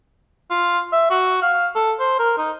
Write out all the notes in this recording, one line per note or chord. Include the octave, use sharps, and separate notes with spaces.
F4
E5
F#4
F5
A4
C5
A#4
D#4